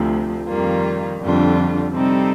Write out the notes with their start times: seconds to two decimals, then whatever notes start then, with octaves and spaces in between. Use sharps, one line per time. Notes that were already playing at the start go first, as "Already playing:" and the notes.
Already playing: D2 C3 F3
0.47 F2 D#3 G3 A#3 F4
1.20 F2 D3 G3 D4 F4
1.93 C3 G3 C4 D#4 A4